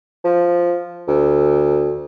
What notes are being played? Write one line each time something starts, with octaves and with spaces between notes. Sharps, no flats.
F3
D2